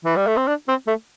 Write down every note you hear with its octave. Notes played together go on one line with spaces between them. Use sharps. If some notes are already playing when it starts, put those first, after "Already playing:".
E3
G3
A3
C4
D4
C4
A3